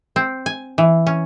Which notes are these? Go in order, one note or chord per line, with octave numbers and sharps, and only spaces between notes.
C4
G#5
E3
C#4